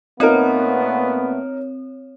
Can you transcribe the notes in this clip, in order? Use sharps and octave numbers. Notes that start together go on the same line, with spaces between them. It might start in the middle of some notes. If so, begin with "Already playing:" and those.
A#2 A3 B3 C4 D#4 A#4 C#5